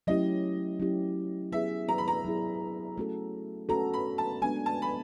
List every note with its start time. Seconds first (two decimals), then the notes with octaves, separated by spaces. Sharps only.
0.07 F#3 A3 C#4 E4 G4 D#5
0.80 F#3 A3 C#4 E4 G4
1.52 F#3 B3 E4 G#4 E5
1.89 A#5
1.98 B5
2.08 A#5
2.24 F#3 B3 E4 G#4
2.98 A3 C#4 F#4 A4
3.69 A3 C#4 F#4 A4 A#5
3.94 B5
4.18 A5
4.42 G#3 B3 D4 G#5
4.66 A5
4.82 B5